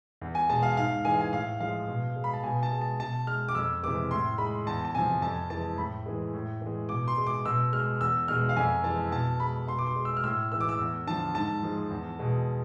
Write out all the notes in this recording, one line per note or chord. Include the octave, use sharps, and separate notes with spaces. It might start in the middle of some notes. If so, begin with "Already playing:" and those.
E2
G#5
B2 G#3 A5
F5
G#2 F5
E3 G#3 G#5
F5
G#5
A2 F5
F3 G#3 F5
B2
G#3
B5
A5
B2 G#5
A5
G#3
A5
B2 A5
G#3 F6
D6
F2 E6
C3 E3 G#3 D6
A2 C6
G#3 B5
E2 A5
A5
C3 F3 G#5
F2 A5
E3 G#3 A5
A2 B5
E3 G#3
A2
E3 G#3
B2 D6
C6
G#3
D6
B2 E6
G#3 F6
E2 E6
B2 G#3 F6
F5
F2 G#5
E3 G#3 A5
B2 A5
G#3 B5
B2 C6
D6
C6
G#3
E6
F6
A2 E6
E3 G#3 E6
D6
E6
E2
D3 F3 A5
G#2 A5
F3 G#3
E2
B2 G#3